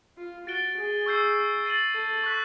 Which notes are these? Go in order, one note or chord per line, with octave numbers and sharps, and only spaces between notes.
F4
F#4 A6 D7 G7
G#4
C#6 E6 G6 C7
A6 C7 D#7 F#7
A4
C#6 F#6 B6